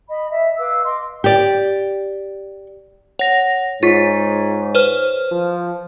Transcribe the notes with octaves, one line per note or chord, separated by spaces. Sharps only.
D#5 B5
D#5 E5
B4 F5 D6 E6
D#5 C6 D6
G4 D5
C#5 F#5 A#6
G#2 F4 C#5 C#6 B6
B4 C5 F6
F3